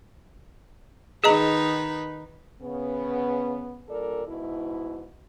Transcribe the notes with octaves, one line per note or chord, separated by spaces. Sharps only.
D#3 D#4 G#4 B4 D#5 A#5
C#3 B3
G2 A#2 A4 A#4 D5
G#2 B2 E4